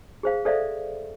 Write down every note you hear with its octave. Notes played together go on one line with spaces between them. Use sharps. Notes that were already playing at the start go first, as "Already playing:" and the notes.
G#4 C5 F5
A4 C5 D5 E5 F5